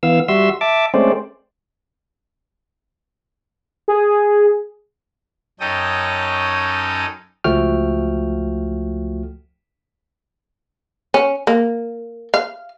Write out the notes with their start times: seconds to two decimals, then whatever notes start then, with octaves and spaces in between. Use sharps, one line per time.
0.03 E3 B3 F5 E6
0.28 G3 F#4 E5 C6 E6
0.61 E5 A5 D6
0.94 G#3 A3 C4 C#4 C5 D5
3.88 G#4
5.60 F#2 C#4 D#4 A4 G5 D#6
7.44 C#2 F3 A3 F#4 G5 F6
11.14 C#4
11.47 A#3
12.34 F5